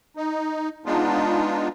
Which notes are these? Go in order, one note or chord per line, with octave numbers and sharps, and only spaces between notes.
D#4
G#3 B3 D4 D#4 F4